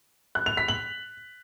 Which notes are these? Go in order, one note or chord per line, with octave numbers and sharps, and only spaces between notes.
F#6
F7
B6
F#7